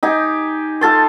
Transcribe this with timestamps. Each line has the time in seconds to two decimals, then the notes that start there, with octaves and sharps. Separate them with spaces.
0.03 D#4 G4 G#5
0.81 F4 A4 A5 C6